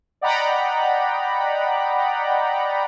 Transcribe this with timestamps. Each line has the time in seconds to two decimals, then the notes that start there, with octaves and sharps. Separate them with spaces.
0.21 D5 D#5 F#5 G5 A#5 B5